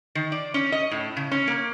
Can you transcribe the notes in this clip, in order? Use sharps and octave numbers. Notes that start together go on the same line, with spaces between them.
D#3
D5
C#4
D#5
A2
C#3
C#4
A#3